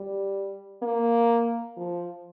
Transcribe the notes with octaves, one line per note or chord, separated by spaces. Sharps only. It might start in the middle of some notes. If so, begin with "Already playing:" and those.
Already playing: G3
A#3
F3